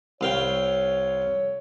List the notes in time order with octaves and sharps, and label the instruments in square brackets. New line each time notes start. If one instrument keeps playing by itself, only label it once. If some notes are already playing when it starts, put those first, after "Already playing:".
[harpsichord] C2 F5 G5 [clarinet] C#5